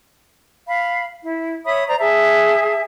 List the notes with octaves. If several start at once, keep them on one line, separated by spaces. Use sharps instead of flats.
F5 B5
E4
C#5 E5 B5 D#6
C5 D5 A#5
G#4 E5 A5